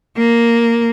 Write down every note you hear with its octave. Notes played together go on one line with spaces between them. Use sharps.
A#3